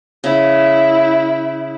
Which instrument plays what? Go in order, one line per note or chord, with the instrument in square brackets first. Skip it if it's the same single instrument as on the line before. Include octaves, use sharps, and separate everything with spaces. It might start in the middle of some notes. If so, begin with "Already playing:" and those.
[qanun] C#3 [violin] E4